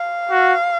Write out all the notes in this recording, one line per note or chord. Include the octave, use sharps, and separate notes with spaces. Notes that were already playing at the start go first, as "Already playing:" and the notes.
Already playing: F5
F#4